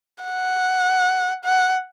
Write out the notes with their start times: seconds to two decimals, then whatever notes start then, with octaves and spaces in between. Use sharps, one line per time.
0.24 F#5
1.44 F#5